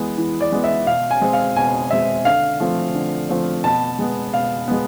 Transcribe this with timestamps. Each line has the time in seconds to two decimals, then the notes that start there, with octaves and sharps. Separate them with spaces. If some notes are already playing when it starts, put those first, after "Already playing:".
Already playing: E3 G#3 B3
0.18 E3
0.41 D5
0.52 G#3 B3
0.64 E5
0.87 B2 F5
1.11 G#5
1.21 G#3 C4
1.33 F5
1.56 B2 G#5
1.91 G#3 C4 E5
2.25 D3 F5
2.60 F3 A3 C4
2.95 D3
3.29 F3 A3 C4
3.64 B2 A5
3.99 G#3 B3
4.33 B2 F5
4.68 G#3 B3